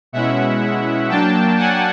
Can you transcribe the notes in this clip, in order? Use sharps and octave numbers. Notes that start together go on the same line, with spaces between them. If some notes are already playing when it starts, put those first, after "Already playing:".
B2 G#3 C#4 E4 E5 F#5
F#3 A#3 D4 G5 A5
F#5 G#5